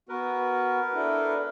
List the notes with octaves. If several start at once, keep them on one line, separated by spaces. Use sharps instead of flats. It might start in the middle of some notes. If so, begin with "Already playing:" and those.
B3 F#4 A#4 B4
D4 E4 A4